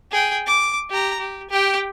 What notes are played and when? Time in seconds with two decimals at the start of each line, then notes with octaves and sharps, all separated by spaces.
0.11 G#4 G5
0.47 D6
0.90 G4 A#5
1.20 G4
1.50 G4 G5